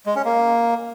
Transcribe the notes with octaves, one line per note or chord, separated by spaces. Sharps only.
G#3
C#4
A#3